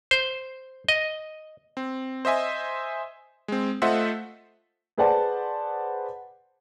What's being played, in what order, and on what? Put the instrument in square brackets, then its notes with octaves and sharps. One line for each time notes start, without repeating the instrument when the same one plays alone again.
[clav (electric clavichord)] C5
D#5
[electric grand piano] C4
C5 D#5 E5 G#5
G#3 C4
A3 F4 C5 D#5 E5 F#5
[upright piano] G#4 B4 C5 D5 F#5 A5